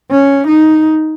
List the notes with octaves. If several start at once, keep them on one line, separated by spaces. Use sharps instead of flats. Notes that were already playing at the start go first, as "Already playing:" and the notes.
C#4
D#4